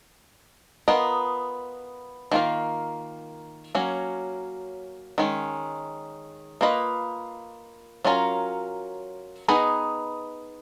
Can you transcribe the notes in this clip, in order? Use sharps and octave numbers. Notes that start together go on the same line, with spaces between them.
B3 F4 A#4 D#5
D#3 A#3 F4 A#4
F#3 A#3 C#4
D#3 G#3 C#4
A#3 F4 B4 D#5
F#3 C#4 F4 A#4
B3 D#4 G#4 B4 D#5